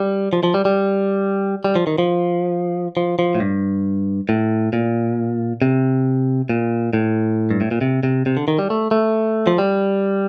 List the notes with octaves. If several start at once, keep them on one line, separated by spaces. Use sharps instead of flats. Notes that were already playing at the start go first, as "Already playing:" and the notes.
Already playing: G3
F3
F3
G3
G3
G3
F3
D#3
F3
F3
F3
A2
G2
A2
A#2
C3
A#2
A2
G2
A2
A#2
C3
C3
C3
D3
D#3
G3
A3
A3
F3
G3